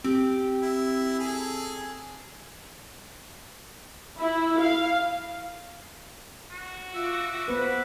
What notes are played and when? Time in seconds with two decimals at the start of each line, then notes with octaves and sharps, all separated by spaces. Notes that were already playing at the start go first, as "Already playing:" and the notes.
0.04 C4 G4
0.63 E4
1.19 G#4 A4
4.19 E4
4.60 F5
6.50 F#4
6.94 F4 E5 D6
7.48 B3 B4 C5